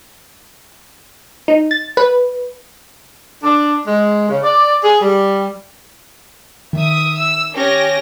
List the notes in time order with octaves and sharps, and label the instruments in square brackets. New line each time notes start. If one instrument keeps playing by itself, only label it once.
[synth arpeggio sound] D#4
A6
B4
[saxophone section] D4
G#3
C#3
D5
G#4
G3
[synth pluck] D#3 [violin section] E5 D#6
[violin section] E6
C#4 G4 A#6